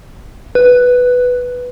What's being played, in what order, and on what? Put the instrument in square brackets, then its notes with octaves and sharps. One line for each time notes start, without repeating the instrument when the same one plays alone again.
[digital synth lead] B4